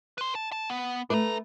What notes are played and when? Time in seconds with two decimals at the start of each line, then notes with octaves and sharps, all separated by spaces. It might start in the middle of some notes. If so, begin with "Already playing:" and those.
0.18 B4 C6
0.35 A5
0.52 A5
0.70 B3
1.10 A3 D4 B4 A#5